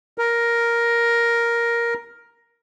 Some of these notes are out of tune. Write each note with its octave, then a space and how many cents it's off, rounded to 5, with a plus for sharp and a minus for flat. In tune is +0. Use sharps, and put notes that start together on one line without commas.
A#4 +5